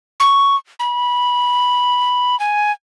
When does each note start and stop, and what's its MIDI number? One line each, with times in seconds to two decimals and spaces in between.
0.20 0.56 85
0.79 2.39 83
2.40 2.72 80